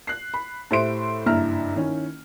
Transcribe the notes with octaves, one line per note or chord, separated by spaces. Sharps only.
F#6 C7
B5
A2 G4 C5 E5 C6 D7
F#1 G2 E4 E5 A#5 F6
D#3 C#4 E4